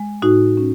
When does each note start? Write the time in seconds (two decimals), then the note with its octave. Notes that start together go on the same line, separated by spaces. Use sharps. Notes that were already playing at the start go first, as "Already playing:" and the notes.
Already playing: G#3
0.22 A2 D#4 F#4
0.57 C#4